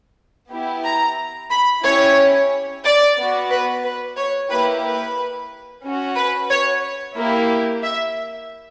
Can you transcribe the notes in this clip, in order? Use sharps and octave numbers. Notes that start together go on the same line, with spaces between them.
B3 E4 G4
A#5
B5
C#4 E4 G4 C#5
D5
B3 F#4
B4
B4
C#5
A#3 E4 G4 B4
B4
C#4 F#4
B4
C#5
A#3 E4 G4
E5